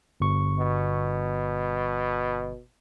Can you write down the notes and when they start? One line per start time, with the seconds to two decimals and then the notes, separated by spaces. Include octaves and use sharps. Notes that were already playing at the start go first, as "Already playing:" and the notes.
0.20 G1 C#6
0.59 B2